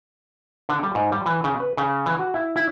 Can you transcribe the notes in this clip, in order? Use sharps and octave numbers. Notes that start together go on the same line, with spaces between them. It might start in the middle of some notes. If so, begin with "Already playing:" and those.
D3
G3
G#2
G3
E3
C#3
B4
C#3
E3
F#4
E4
E4